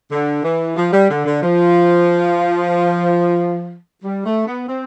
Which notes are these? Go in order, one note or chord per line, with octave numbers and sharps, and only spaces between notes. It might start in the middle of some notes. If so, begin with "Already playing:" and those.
D3
E3
F3
G3
D3
D3
F3
G3
A3
B3
C4